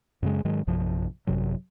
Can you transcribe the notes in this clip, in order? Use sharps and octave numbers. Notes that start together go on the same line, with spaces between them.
F#2 C#3 G#3
G#2 D#3 F#3 G#3
A#1 F#2 C3 F3
G#1 F#2 C3 F#3